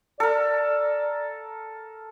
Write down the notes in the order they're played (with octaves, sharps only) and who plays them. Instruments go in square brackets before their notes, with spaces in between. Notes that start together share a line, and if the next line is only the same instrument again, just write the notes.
[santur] A4 A#4 [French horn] D5